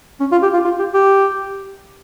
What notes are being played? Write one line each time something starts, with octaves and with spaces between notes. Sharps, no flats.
C#4
F4
G4
F4
F4
G4
G4